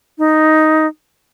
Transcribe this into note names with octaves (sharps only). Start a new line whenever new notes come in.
D#4